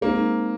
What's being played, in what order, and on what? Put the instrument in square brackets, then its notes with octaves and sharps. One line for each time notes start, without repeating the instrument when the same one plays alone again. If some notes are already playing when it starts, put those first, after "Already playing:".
[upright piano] G#3 C4 D#4 [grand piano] A#3